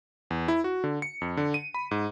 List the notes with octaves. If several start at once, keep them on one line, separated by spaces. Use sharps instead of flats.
E2
E4
F#4
D3
C#7
F2
D3
D#7
B5
G#2